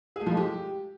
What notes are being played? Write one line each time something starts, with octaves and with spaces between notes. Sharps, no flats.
G#4
A3
F3
G#3
G4